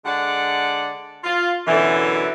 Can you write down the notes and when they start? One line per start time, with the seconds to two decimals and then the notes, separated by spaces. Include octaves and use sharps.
0.05 D3 G#3 D5 F#5
1.24 F4
1.67 F#2 B2 D3 E3